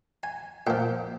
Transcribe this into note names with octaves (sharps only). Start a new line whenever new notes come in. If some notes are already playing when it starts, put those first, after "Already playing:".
G#5
A#2 F3 G5